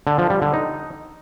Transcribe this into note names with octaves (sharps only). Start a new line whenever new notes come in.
D3
F3
G3
D3
D#4